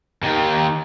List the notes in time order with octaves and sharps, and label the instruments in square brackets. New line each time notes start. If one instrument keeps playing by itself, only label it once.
[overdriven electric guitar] D#2 D#3